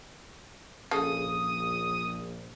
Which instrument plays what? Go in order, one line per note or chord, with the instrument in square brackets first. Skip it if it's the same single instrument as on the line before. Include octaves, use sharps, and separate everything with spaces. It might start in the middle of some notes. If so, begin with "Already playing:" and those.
[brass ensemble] A#1 [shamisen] C#3 A4 [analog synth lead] D#6